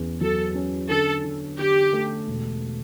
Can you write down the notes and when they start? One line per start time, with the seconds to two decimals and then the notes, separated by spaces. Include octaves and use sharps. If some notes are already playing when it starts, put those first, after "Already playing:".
Already playing: E2 C#4
0.21 F#3 A4
0.55 C#4
0.89 D3 A4
1.24 D3
1.59 D3 G4
1.93 A3
2.27 E1